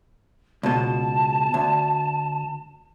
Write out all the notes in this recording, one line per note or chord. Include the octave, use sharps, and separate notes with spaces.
C#2 B2 A5
D2